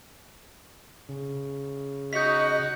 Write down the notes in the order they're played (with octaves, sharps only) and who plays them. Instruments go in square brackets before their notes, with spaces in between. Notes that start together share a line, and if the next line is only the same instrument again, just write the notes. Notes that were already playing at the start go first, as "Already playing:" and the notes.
[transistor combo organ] C#3
[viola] D#4 F#4 [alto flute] D#5 [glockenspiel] G6 B6